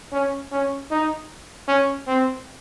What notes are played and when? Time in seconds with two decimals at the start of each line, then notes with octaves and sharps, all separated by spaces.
0.12 C#4
0.52 C#4
0.91 D#4
1.68 C#4
2.07 C4